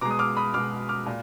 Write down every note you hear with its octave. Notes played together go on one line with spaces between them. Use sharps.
B2 G#3 A#5 D6
D#6
D6 F6
B5 D#6
B2 G#3 D6 F6
D6 F6
A#2